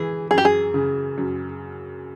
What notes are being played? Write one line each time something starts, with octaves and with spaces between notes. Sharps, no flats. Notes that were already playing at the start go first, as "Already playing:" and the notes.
Already playing: E3 G#4
F#2 G#4
G4
G#4
C#3
F#2